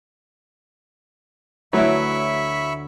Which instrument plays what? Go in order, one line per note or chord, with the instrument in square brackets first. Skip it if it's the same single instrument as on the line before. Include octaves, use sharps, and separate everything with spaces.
[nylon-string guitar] D2 B4 C#5 [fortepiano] F#3 E4 [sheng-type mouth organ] E5 B5 C#6